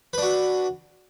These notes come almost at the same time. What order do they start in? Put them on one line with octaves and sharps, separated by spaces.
B4 D4 F#4